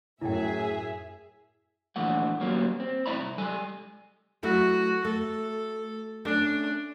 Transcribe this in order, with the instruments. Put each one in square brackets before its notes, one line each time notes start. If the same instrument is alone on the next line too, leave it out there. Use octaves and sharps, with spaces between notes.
[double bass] F#2 [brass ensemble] A2 [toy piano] E4 G5 [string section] G#4 E5
[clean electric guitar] A#2 D3 E3 F3 A3 F#5
D2 F#3 G3 A#3 B3 C#4
C4
A2 E4 D5 E5 A#5 B5
C2
G3 G#3 A4 G#5
[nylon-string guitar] F#3 A3 E4 [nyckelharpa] F#4
[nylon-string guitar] A3 [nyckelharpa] A4
[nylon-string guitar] A3 C#4 [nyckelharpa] D4